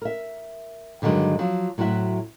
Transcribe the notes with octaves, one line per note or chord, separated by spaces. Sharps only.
A#4 E5
G2 D3 D#3 F#3 G#3
F3 F#3
A2 F#3 C4 F#4 E5